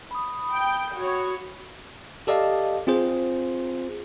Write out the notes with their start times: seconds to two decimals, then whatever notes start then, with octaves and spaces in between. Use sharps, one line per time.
0.11 B5 D#6
0.54 G5
0.96 F#4 C#5
2.27 G4 A4 D5 D#5 F5 A5
2.87 C4 F4 G#4 C5